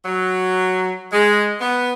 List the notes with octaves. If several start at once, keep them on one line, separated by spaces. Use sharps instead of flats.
F#3
G#3
B3